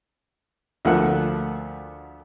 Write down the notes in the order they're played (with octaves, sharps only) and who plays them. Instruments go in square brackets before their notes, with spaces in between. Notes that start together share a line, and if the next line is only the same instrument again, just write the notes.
[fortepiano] D2 F3 A3 A#3 F#5